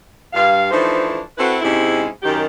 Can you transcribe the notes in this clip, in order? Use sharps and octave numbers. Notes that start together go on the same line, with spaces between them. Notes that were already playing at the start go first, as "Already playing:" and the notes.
G2 F5
E3 F3 A3 D4 D#4 C5
C4 E4 F#4 A4 B4
G#2 C3 G#3 C#4 E4
F#2 D#3 G4